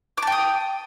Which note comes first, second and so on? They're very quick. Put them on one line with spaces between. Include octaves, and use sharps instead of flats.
D6 A5 G5 D#6